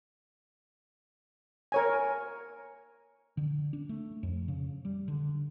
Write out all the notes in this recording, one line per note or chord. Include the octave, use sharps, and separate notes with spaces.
A#4 C#5 G#5
D3
D4
A3
F2
C#3
G3
D3